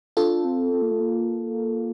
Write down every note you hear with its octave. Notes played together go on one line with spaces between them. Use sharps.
D4 F4 A4
C4
C4
A#3
A3
A#3